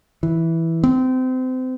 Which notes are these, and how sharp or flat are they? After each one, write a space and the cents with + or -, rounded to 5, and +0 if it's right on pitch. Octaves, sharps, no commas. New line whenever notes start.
E3 -5
C4 -30